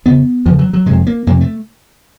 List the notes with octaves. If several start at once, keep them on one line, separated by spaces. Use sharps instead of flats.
E2 C#3 B3
E2 C#3 F3
F#3
F#3
F2 C3 G#3
A#3
F2 C3 A#3
A3